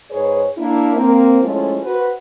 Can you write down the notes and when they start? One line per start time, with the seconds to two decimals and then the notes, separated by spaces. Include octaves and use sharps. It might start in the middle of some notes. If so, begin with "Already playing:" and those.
0.11 G#2 G#4 B4 C#5
0.58 A#3 D4 E4
0.95 A#3 C4
1.41 F3 G#3 A3 C#4 E4 F4
1.82 F#4 B4 C5